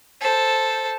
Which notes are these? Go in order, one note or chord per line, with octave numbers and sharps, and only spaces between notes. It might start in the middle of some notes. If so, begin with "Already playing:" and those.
A4 C5